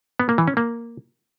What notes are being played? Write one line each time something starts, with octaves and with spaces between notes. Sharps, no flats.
B3
A#3
E3
C#4
A#3